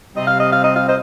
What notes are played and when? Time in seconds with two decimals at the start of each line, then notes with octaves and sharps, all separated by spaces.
0.16 C3 G3 C4 D#5
0.27 F5
0.39 D#5
0.52 F5
0.63 D#5
0.75 F5
0.87 C5 D#5